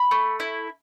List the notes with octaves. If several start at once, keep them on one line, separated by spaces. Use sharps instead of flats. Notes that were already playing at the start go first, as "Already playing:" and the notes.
Already playing: B5
A3
E4